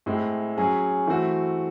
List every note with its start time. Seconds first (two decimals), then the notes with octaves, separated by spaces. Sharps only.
0.06 A2 G#3 C4 E4
0.57 F#3 C#4 G#4
1.07 E3 A3 C4 F#4